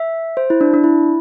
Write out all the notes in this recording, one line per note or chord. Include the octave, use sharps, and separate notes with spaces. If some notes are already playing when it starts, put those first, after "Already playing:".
Already playing: E5
C5
E4
D4
D4
E4